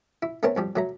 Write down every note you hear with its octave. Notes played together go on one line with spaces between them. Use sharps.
E4
A3 B3 C4 A#4 C#5 A5
F2 F3 G3
F#3 A3 A#5